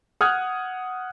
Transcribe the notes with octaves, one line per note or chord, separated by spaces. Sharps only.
F#5 D#6 F6 F#6 G#6